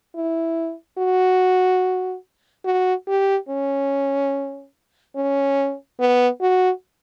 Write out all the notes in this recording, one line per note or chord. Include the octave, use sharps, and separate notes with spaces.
E4
F#4
F#4
G4
C#4
C#4
B3
F#4